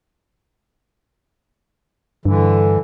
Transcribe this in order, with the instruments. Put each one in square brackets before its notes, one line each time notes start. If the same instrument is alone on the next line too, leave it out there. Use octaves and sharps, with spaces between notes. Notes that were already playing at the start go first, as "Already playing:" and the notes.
[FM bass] G2 [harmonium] D3 E3